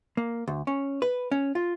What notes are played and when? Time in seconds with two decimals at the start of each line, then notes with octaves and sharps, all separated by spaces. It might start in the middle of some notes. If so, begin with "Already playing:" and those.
0.17 A#3
0.48 D2
0.67 C#4
1.02 B4
1.32 C#4
1.55 F4